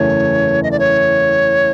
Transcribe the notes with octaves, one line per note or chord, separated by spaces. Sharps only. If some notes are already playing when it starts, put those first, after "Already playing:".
Already playing: F#1 E2 C#3 E3 A3 C#5
D#5
D5
C#5